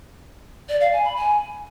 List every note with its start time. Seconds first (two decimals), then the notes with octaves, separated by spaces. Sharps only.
0.69 D5
0.81 F5
0.93 G#5
1.04 B5
1.16 G#5